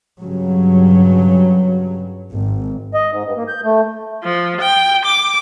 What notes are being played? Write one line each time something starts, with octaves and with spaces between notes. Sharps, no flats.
G2 C#3 F#3
G#1
D#5
G#2
G2
A#3
G6
A3
F3
G5
D6